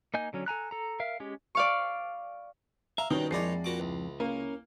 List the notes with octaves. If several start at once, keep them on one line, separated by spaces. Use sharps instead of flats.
A#3 D#4 D#5 G#5 G6
D3 F#3 C#4
A4 G#5 A#5 F#6
A4 A#5
A#4 E5 F5
G#3 C#4 G4
D5 F5 C#6
E5 F5 A#5
G2 B2 D#3 C#4 G5
A#1 F2 G#3 D#4 E4 C#5 D5 C7
A#2 F#4 D6
C#2
A#3 C#4